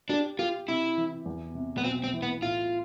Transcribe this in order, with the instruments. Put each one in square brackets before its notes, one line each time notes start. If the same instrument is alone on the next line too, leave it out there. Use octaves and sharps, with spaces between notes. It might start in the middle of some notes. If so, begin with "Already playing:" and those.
[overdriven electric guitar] D4 [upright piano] G4
[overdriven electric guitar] F4 [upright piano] G4
[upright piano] C3 [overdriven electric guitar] E4
[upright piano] E3
E2
C3
[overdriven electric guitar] B3
[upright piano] B1 [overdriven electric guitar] C4
[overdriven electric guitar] C4
[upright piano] E3
[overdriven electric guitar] B3
[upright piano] A2 [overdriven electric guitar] F4